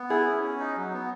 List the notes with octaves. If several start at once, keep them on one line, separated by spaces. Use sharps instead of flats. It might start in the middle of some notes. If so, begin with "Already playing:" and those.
Already playing: B3
E4 G#4
C#4
C#4
D#4
F#3
B3